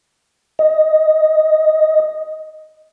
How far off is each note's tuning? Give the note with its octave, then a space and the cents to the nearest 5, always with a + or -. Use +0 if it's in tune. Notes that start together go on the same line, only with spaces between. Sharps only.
D#5 +5